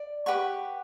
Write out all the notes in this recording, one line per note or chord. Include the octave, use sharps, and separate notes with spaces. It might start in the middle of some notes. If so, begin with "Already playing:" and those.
Already playing: D5
G4 B4 F#5 C#6